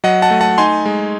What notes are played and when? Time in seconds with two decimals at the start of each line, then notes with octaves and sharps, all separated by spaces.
0.04 F#3 D#5 F#5
0.22 F#5 A5
0.31 A3
0.41 F#5 A5
0.58 D#4 G#5 C6
0.86 G#3